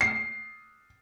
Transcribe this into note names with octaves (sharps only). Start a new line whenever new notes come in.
C7